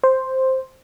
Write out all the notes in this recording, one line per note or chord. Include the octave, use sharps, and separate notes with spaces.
C5